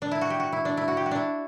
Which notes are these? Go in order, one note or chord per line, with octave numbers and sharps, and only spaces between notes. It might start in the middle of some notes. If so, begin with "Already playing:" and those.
D4
E4
F#4
G4
F#4
E4
D4
E4
F#4
G4
F#4
D4 E4